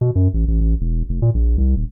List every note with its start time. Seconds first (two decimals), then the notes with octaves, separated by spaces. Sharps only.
0.01 B2
0.15 F#2
0.34 A1
0.48 A1
0.61 A1
0.81 E1
1.09 F1
1.22 A#2
1.34 A#1
1.58 C2
1.76 D#1